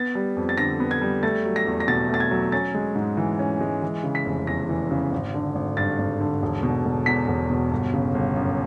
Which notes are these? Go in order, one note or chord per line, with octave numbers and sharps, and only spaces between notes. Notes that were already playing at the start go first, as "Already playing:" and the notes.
Already playing: B3 A6
G3
F2
A6
D3 A#6
B3
G#6
G3
A3 A6
F#3
A#6
E2
A#6
B2 A6
A3 A6
G#6
F#3
C#4 A6
G#3
G#2
E3
C#4
G#3
E3
C#3
B6
F1
E2 A#6
E3
C#3
G#1
D3
G#1
G2 A6
G#1
D3
E1
B2
E1
E2 B6
E1
B2
G1
C#3
G1
F#2